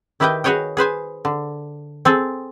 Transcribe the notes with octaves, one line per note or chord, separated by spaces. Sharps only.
D#3 E4 G4 B4 D#5 G5
F#4 G#4 B4 C#5 D#5 G5
G#4 B4 C5 G#5
D3
C4 G#4 A4